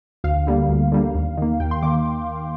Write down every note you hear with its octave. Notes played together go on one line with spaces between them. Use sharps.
D2 F5
D3 G3 A#3
D2
D3 G3 A#3
D#2
D#3 A#3
D#2 G5
C6
D#3 A#3 D6